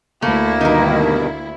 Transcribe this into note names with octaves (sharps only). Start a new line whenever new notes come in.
D2 A3 A#3 E4
G2 B2 D#3 D#4 A#4